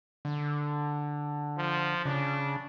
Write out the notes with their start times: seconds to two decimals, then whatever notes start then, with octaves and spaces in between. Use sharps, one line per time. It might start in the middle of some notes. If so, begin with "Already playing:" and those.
0.25 D3
1.57 F3
2.05 C#3 D4